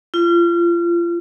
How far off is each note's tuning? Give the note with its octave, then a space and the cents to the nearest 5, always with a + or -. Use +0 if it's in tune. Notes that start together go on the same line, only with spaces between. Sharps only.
F4 -30